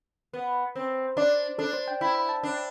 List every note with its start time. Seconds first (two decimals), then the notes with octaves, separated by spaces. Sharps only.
0.33 B3
0.76 C4
1.17 D4 D5
1.58 D4 A4
1.73 C5
1.88 G5
2.01 E4 B5
2.15 B5
2.29 A5
2.43 D4